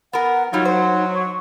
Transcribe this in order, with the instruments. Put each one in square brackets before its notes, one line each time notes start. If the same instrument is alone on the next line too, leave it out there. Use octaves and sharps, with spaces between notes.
[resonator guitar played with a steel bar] B3 A#4 [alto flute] F#5
[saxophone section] F#3 [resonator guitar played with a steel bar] G3 F4 [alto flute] D#4
[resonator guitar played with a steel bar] C5
[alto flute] C#6